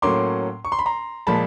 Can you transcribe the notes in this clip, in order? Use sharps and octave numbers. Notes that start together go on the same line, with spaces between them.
A2 F#3 A#3 C#4 C6 D6
C#6
C6
B5
A#5 C6
A#2 F3 G#3 A5 B5